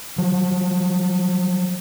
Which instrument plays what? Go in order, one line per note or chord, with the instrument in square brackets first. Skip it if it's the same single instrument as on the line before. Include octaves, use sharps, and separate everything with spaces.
[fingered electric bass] F3 F#3